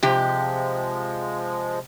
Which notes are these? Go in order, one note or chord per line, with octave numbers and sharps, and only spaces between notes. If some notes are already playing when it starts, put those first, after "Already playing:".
C3 F3 G#3 G4